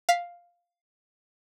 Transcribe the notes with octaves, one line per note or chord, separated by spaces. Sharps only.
F5 B6